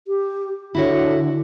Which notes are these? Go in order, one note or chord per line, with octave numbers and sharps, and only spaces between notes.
G4
D3 E4 F#4 C#5